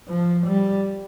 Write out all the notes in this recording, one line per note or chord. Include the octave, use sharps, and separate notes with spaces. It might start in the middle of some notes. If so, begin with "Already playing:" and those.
F3
G3